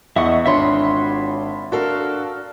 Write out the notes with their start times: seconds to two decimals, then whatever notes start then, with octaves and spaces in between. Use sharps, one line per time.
0.16 E2 D#5 E5 F#5 C#6
0.46 G#1 D4 F4 F#4 C#5 E5 B5 C6
1.72 D4 F#4 A4 A#4 F5